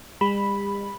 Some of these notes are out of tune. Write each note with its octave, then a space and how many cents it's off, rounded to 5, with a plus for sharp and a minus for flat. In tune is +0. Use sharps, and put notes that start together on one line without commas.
G3 +45 B5 +0